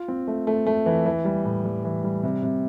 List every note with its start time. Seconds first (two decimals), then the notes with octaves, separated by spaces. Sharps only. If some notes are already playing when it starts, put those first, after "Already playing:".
Already playing: F4
0.08 C4
0.27 A3
0.47 A3
0.67 A3
0.86 E3
1.06 E3
1.25 G3
1.45 A2
1.65 G3
1.84 E3
2.04 G3
2.23 C3
2.43 C3